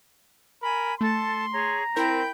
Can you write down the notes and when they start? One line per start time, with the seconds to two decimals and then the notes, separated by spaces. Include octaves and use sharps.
0.63 A#4 G#5 B5
1.01 A3 A4 A5 C6
1.54 G#4 C#5 A#5
1.96 C4 E4 A#4 G5 B5 G6 A#6